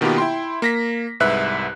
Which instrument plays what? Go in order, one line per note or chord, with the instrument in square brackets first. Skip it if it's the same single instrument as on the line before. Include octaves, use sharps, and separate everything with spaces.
[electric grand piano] B2 D#3 A#3 B3 F4 G4
E4 G5 C6
A#3 A#6 B6
C2 G#2 B4 E5 F#6